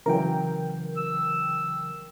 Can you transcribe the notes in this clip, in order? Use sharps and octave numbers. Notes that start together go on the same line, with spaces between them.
C#3 E3 F#3 A#4 G5
E6